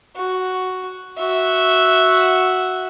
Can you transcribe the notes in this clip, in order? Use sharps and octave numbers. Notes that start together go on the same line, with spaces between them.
F#4
F#4 E5